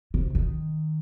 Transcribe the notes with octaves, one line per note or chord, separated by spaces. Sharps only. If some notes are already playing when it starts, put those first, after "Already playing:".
C3
D#3